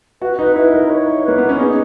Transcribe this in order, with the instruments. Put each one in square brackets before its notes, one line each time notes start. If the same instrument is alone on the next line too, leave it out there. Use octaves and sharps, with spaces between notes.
[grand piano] F#4 [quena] B4
[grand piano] D#4 [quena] B4
[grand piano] E4 [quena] B4
[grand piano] D#4 [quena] A#4
[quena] C#5
[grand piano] A#3 [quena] B4
[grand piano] B3
C#4
[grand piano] D#4 [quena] G#4